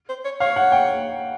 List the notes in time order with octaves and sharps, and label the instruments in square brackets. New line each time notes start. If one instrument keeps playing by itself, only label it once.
[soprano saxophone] C5
C#5
[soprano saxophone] C#5 [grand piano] F5
[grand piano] F#5
G5